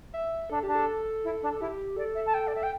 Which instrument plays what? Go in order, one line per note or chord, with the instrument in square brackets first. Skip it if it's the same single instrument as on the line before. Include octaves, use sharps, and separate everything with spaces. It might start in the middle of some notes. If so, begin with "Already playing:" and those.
[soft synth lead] E5
[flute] D4 [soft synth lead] A4
[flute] D4 [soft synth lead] G4
[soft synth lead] A4
[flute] E4
D4
[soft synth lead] A4
[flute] E4 [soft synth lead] G4
[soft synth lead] A4 [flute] D5
[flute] E5
A5
G5
D5
E5
G5